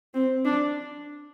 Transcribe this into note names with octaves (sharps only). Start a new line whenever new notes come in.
C4
D4